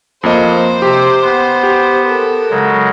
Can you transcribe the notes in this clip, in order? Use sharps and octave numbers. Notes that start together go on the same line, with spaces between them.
F2 A#3 C5 D#5
C3 G4
B3
G4
A4 A#4
C#3 F#3 G#3